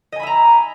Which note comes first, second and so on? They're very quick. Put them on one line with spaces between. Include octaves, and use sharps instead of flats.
D#5 G#5 B5 E5 A#5